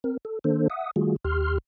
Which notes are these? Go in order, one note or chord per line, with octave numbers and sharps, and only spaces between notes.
C4 A#4
A4
D#3 A#3 D4 A4 C5
E5 F#5 D#6
D#3 G3 A3 F4 F#4 G#4
D#2 G4 C6 F6